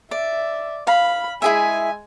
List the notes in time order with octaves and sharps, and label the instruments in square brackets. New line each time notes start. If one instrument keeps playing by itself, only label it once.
[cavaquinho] D5 [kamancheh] E5
[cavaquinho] F5 [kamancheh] B5
[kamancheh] G#3 G#5 [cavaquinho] E4 G#4 E5